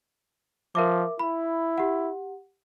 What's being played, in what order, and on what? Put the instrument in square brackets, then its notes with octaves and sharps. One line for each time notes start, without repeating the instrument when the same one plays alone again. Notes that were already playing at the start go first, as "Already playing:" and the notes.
[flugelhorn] F3 [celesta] A#4 E5 D6
[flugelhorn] E4 [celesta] B5
[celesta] G4 F#5